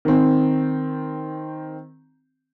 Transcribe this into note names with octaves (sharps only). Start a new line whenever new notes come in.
D#3 C4